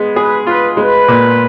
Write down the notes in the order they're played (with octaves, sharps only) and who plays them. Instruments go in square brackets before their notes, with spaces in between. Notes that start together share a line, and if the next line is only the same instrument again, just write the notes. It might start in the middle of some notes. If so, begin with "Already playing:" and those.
Already playing: [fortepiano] G#3 B3
[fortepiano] G#4 [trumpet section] B4
[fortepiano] F4 [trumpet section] B4
[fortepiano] G#3 [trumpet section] B4
[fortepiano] A#2